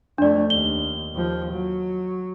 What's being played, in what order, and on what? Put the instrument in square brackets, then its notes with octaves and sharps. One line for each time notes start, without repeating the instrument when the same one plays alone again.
[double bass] F2 A3 [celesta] D4 D5
[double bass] D#2 [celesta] G7
[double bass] D#2 F3
F#3